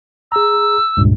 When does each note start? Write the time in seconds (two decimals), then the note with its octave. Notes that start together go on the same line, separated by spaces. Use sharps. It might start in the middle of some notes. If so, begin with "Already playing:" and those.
0.32 G#4 A#5 E6
0.97 C#2 G2 A#2